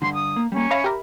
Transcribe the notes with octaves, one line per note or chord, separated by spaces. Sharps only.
G2 D3 C6
D#6
A#3
G3 A#3 C#4
C#5 E5 F5 A#5 B5
G4 A#4